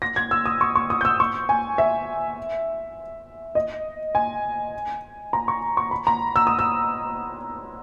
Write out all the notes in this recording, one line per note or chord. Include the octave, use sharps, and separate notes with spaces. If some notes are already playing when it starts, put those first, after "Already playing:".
A#6
G#6
E6
D#6
C#6
C#6
D#6
G6
E6
C#6
G#5
E5
D#5
G#5
A#5
C#6
C#6
B5
A#5
E6
D#6
E6